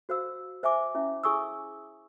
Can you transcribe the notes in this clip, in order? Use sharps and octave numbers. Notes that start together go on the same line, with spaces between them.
F#4 C5 F5 E6
C5 E5 G#5 D6
C#4 E4 E5
E4 G#4 G#5 C#6 D#6 E6